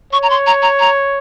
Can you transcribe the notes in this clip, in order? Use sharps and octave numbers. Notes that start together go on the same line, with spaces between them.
C#5 C#6
A#5
C6
A#5
A#5
A#5